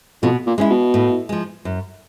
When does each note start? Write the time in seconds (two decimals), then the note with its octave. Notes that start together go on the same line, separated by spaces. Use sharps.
0.23 F2 B2
0.46 A#2
0.58 G#3 C#4 E4
0.70 B2
0.94 A2
1.29 F3 G#3
1.65 F#2